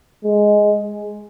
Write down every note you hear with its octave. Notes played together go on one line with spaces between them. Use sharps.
G#3